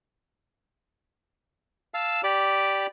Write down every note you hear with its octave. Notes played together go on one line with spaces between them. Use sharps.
F5 A5 E6
G4 D5 B5 D6